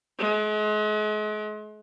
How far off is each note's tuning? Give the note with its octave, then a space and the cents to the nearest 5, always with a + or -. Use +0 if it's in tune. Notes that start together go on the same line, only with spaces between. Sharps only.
G#3 +40